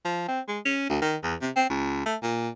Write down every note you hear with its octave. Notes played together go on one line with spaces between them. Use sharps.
F3
C4
G#3
C#4
D2
D#3
E2
C3
C4
C#2
A3
A#2